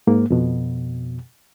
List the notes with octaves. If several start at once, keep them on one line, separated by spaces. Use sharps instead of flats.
G#2 A#3
F2 B2